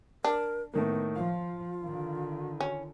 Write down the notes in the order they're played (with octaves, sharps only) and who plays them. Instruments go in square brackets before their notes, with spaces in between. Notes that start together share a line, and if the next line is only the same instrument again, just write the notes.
[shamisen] D4 [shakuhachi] A#4
[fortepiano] A2 D#3 A#3 [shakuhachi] B3
[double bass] F3 [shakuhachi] F4 [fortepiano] F5
[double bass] D3 D#3
[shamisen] C#4